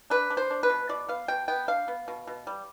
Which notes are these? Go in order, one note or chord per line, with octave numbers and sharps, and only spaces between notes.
D4 B4
D4
C5
D4
B4
B2
B2 D5
B3 F5
B2 G5
B3 G5
D4 F5
B3
B2
B2
G3